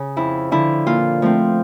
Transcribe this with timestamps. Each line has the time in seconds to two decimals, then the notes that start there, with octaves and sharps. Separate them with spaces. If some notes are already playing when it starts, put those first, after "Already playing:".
Already playing: C#3
0.16 F2 E4
0.52 D3 F3 E4
0.86 A#2 F4
1.22 F3 A3 C4